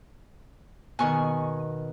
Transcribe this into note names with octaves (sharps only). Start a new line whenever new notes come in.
B2 D#3 G#5 C#6